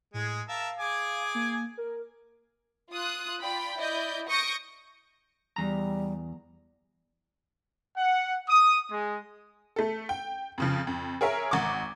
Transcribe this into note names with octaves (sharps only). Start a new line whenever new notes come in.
A2 G#3 G#4
A#4 E5 F5 A5
G#4 G#5 D6
A#3
A#4
F4 D#6 F#6
F4 D5 G5 B5
E4 D5 D#5 G6
C#6 D#6 G6 A#6 C#7 D7
E2 G3 A#5
F#5
D#6
G#3
A3 A4
G5
F2 C#3 F3
F2
G#4 A#4 C#5 E5 G#5 A#5
G#1 F#5 A#5 C#6 D6